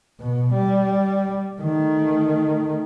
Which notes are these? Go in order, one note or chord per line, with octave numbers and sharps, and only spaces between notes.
B2
G3
D#3 A3